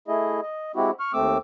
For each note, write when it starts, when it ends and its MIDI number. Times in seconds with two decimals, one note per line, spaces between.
0.08 0.40 57
0.08 0.40 64
0.08 0.40 68
0.08 0.40 75
0.43 0.72 75
0.76 0.91 56
0.76 0.91 60
0.76 0.91 64
0.76 0.91 66
0.76 0.91 67
1.00 1.12 85
1.00 1.12 89
1.13 1.38 39
1.13 1.38 57
1.13 1.38 60
1.13 1.38 86
1.13 1.38 88